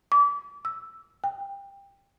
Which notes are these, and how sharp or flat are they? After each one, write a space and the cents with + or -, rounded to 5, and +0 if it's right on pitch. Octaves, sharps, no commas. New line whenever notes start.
D6 -30
E6 -5
G5 +20